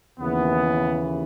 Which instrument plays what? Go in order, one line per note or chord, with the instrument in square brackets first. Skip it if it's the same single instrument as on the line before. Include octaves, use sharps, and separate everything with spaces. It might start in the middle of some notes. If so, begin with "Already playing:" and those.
[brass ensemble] D#2 C#3 E3 B3